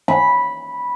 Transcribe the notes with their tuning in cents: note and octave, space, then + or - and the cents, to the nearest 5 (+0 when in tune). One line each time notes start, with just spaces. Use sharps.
B5 -10